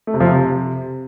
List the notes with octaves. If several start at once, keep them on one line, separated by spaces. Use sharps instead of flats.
A3
C3
F3
C3